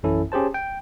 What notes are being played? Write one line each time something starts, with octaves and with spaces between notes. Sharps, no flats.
A#1 F#2 E3 C#4 E4 A4
C#4 G4 G#4 C5 A5
G5